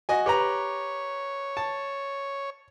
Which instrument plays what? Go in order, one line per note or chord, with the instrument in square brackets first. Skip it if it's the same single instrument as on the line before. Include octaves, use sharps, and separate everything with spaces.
[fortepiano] F#4 D#5 G#5
[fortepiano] G4 B4 A#5 [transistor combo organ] C#5
[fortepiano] A5